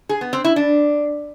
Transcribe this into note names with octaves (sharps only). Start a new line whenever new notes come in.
G#4
B3
C4
E4
D4